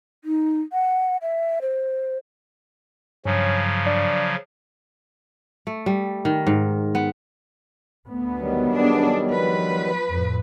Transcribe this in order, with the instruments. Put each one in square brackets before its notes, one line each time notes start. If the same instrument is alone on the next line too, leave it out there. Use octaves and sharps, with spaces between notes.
[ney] D#4
F#5
E5
C5
[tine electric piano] G2 [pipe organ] C#3 F3 F#3 [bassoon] C#4
[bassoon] D4
[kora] A3
G3
D#3
G#2
B3
[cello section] D2 [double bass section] B3
[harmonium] D#3 F#3 G3
[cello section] D4 G#4
F3 B4
[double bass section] F2 A2